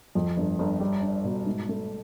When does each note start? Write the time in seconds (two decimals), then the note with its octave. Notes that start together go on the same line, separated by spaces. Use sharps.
0.15 F2
0.37 G1
0.59 G1
0.80 G3
1.02 D4
1.24 B2
1.46 G#2
1.69 A3